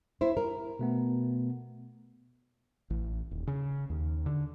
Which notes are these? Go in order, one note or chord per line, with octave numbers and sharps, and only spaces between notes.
E4 C5
A#4
B2 A3 B3
A1
D#1
C#3
D#2
D3